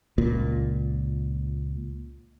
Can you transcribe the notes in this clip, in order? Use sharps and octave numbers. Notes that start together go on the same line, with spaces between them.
C#2 A#2